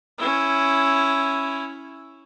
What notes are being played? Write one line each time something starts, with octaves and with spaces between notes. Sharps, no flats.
C#4 E4